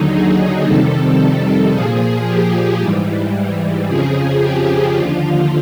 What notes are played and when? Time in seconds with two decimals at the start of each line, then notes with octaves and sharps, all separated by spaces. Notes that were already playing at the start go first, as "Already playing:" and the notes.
Already playing: D#2 D3 F#3 D#4
0.12 G#4
0.65 F2 C3 D#3 G3 A4
1.72 A#2 F3 G#4
2.26 G4
2.80 G#2 E3 G3
3.87 F2 C#3 F3 G#4
4.41 G4
4.95 D#2 D3 F3 F4